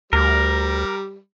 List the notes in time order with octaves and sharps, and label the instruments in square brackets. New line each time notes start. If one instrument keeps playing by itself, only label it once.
[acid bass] D2 [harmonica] G3 [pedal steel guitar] A#4